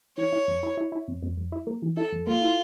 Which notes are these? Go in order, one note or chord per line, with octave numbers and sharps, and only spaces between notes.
E3 C#5
E4
F2
E4
E4
E4
F2
F2
F2
E4
A#3
E3
E4 A4
F2
A#3 F4
E4